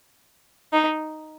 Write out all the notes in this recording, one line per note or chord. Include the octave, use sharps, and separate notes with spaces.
D#4